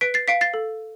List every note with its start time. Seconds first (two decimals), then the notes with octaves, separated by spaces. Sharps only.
0.01 B4 B6 D7
0.14 A6 C7
0.28 F5 B6 D7
0.41 A6 C7
0.54 A4